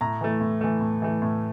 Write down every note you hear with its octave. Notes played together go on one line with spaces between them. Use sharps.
A2 A#5
E3 A3
A2
E3 A3
A2
E3 A3
A2